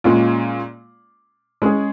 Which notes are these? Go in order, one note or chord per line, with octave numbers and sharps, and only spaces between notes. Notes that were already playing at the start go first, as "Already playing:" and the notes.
A#2 G#3 C#4 F4
G#3 C#4 G#4